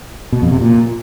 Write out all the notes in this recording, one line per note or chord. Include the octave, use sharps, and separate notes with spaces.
B2
F2
C3
A#2